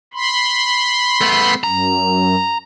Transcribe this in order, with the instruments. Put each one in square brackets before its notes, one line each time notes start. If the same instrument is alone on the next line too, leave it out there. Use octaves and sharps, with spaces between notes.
[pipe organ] B5 C6
[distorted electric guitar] A3 B3
[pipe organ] F#2 [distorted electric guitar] A#5